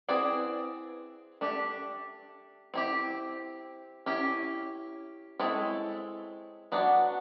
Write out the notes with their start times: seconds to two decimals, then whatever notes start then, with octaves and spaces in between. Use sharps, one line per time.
0.08 C4 E4 G#4 B4 D5
1.41 A3 D4 G4
2.74 C4 E4 G4
4.06 C#4 E4 G4
5.39 G#3 C4 E4 A4 C#5
6.72 F#3 B3 D4 F#4